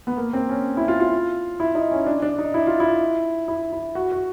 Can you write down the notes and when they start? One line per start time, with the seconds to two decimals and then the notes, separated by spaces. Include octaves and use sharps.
0.07 B3
0.17 A#3
0.33 C4
0.49 C#4
0.77 E4
0.88 F4
1.00 F4
1.60 E4
1.75 D#4
1.91 C#4
2.06 D4
2.22 D4
2.38 D#4
2.54 E4
2.67 F4
2.80 E4
3.48 E4
3.73 E4
3.95 F#4
4.12 F#4